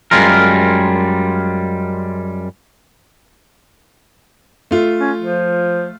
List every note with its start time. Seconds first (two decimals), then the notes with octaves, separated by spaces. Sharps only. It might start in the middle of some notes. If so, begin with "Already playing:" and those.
0.11 F#2 G3 G#3 F4 A#4
4.71 A3 F4
5.00 C#4
5.19 F3